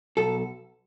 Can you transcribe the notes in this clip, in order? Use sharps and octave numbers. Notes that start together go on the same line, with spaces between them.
B1 A4